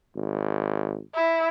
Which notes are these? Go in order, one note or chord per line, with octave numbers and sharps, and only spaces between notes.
G#1
E4